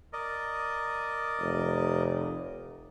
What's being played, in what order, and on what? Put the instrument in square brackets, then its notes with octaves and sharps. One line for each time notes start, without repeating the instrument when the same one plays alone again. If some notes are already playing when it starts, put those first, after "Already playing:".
[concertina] A#4 D5 D#5
[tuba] F1